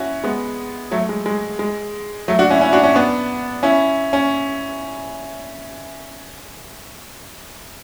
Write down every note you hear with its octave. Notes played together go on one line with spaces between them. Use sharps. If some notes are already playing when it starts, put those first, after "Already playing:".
Already playing: C#4 E4 F#4
G#3 B3
F#3 A3
G#3
G#3
G#3
F#3 A3
D4 F#4
C#4 E4
C#4 E4
D4 F#4
C#4 E4
B3 D4
C#4 E4
C#4